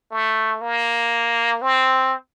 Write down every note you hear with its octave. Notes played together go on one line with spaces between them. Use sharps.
A3
A#3
C4